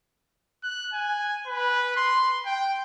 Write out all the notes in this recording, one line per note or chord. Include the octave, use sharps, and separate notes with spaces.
F#6
G#5
B4
C6
G5